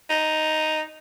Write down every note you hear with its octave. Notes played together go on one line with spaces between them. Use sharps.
D#4